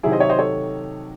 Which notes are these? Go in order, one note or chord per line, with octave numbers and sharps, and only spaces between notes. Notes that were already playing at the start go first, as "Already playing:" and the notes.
C3 D#3 F#3 E4 G#4
C5 D#5
C#5 E5
C5 D#5
A4 C#5